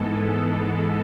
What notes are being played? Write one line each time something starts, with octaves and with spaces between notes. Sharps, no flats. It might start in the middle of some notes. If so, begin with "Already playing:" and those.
Already playing: G#2 E3 G#3 B3 A4